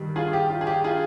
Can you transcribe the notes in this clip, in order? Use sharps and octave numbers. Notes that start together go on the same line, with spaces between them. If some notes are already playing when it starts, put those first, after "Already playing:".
Already playing: G2 D#3 G3
F4 G#4
G4
F4
G#4
G4
F4 G#4